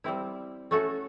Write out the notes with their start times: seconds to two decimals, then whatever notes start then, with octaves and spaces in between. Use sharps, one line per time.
0.04 G3 C4 E4
0.71 A3 C#4 F#4 A4